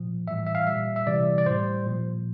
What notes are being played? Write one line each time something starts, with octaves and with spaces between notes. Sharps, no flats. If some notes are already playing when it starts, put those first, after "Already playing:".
Already playing: A#2 F3
A2 E3 G3 E5
E5
F5
G3 E5
A#2
E5
C3 E3 G3 D5
D5
A2 G3 C5
A#2 F3